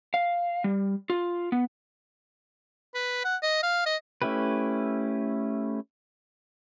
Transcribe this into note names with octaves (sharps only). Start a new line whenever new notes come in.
F5
G3
F4
B3
B4
F#5
D#5
F5
D#5
A3 C#4 E4 G4 B4